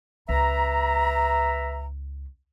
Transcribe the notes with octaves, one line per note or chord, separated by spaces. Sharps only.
C#2 B4 E5 A#5